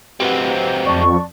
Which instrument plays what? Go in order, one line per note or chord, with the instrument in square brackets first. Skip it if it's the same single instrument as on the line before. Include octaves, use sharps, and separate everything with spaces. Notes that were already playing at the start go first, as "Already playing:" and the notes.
[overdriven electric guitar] F#3 C4 [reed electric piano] G4 B4 F#5
[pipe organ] F2 [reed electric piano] D5 A5 [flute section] C#6